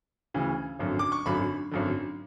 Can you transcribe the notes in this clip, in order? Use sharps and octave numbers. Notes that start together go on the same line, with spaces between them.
D2 C#3 E3
G#1 F#2 D3
D6
C#6
G#1 F#2 D3 B5
G#1 F#2 D3